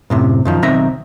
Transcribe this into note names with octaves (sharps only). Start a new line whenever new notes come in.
F#2 A2 C3
F#2 D#3 F3
B1 D#3 C4 E5 A#5